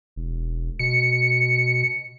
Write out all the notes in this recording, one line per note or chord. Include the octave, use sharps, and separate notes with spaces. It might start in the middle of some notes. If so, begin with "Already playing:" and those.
E1
B2 C#7